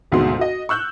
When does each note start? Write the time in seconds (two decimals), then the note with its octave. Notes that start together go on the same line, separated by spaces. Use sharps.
0.12 G#1 D2 G#2 B2 F#4 C6
0.39 F#4 D#5
0.69 C#6 E6 F#6 G6